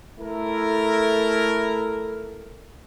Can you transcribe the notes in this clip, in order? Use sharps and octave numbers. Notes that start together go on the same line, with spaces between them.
A3 E4 A4 A#4